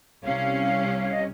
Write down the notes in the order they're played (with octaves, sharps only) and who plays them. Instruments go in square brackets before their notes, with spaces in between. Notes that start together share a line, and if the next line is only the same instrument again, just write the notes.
[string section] C2 C3 G3 C#4 [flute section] F5
[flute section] C#5
D#5